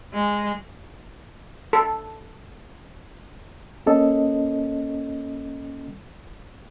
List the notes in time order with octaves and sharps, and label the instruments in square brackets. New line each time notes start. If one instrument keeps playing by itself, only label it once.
[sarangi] G#3
[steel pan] A4
[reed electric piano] A#3 C#4 A4 D#5